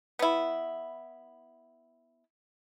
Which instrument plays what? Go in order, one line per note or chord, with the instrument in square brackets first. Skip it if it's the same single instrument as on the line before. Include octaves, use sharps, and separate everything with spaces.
[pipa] B3 E4